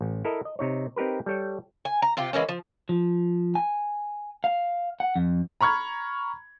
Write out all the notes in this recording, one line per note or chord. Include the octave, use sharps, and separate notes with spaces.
A1
E4 A4 A#4 D#5
D#5
C3 D#4 C#5
C4 D#4 G4 A#4 B4
G3 A4 C#5 G5
G#5
A#5
C3 F4 G4
E3 G#3 A#3 C#4
F3
F3
G#5
F5
F#5
F2
A#5 B5 C#6 F6 G#6